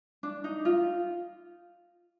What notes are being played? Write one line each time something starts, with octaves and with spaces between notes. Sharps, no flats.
D4
D#4
F4